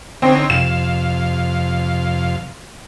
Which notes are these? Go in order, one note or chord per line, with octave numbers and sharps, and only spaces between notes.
D3 C4 C#4 D#4
F2 C3 F5 E7